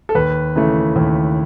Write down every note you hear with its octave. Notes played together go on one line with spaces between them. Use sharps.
A4
D#2 B4
C#3 E3 A3
D#2